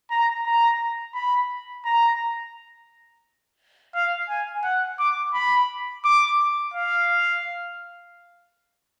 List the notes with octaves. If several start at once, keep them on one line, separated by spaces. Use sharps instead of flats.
A#5
A#5
B5
A#5
F5
G#5
F#5
D6
B5
D6
F5